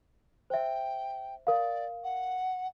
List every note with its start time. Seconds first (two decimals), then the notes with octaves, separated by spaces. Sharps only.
0.50 C5 E5 G5
1.47 A#4 D5 F5
2.03 F#5